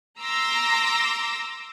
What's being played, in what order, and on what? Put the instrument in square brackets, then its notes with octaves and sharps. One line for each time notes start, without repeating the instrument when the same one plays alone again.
[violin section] A#5 C6 D6 E6 A#6